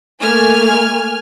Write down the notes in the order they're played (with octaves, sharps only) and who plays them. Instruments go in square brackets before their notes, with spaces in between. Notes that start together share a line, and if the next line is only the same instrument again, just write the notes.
[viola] A3 A#3 [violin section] G#5 F6